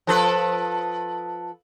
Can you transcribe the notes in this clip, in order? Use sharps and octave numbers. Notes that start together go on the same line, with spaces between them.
F3 A4 B4